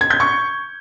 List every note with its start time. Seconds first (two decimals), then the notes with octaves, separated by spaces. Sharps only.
0.01 G#6
0.10 G6
0.20 C#6